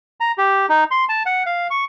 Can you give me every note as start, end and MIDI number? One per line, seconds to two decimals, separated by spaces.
0.20 0.32 82
0.38 0.66 67
0.69 0.84 63
0.91 1.05 84
1.09 1.23 81
1.26 1.43 78
1.46 1.67 77
1.70 1.85 85